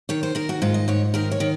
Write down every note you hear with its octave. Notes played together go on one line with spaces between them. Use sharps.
D#3 C#5
C5
D#3 A#4
F#4
G#2 F4
D#5
G#2 C#5
D#3 A#4
C#5
D#3